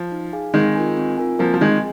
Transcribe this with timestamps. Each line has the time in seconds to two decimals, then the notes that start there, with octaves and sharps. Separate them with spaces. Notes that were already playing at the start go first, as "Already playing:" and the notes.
Already playing: F3
0.12 D#4
0.33 G#4 F5 G#5
0.54 D#3 G#3 C4
0.76 F4 A#4 G#5
0.97 C4
1.18 F4 A#4 G#5
1.39 F3 A#3 C4
1.54 F3
1.61 D#3 G#3 G#4 D#5 G#5